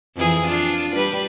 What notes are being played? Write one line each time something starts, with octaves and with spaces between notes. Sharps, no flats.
F2 E3 G#4
D4 F4
G3 B4